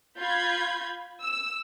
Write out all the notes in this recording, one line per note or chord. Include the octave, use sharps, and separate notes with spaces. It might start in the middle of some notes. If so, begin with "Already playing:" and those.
F4 B5 G6 G#6
E6